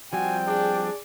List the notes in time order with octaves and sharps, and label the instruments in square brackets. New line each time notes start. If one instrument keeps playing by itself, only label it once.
[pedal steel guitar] F3 G3 C4 [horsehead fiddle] F#4 [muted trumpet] G5 [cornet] G#5
[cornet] D4 [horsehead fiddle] G#4 D5